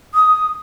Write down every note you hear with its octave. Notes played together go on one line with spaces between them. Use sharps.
D#6